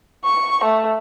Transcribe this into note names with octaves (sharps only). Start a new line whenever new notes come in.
C#6
A3